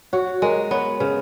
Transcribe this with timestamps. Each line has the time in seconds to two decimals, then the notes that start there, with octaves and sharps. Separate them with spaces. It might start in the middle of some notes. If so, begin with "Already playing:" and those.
0.13 F#4 C#5
0.42 G#3 A#4
0.71 B3 C#5
1.00 C#3 B4